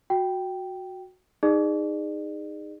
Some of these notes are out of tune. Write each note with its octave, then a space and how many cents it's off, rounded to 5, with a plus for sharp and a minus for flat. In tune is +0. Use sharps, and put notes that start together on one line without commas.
F#4 -10 G5 -5
D#4 +0 G#4 -20 D5 +40